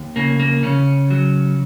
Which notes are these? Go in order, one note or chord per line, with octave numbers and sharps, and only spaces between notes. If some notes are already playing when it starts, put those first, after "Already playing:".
Already playing: D#2
C#3 A#3
A#3
C#3 C#4
F#3